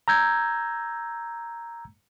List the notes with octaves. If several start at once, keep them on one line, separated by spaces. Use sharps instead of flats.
A#5 E6 G6 G#6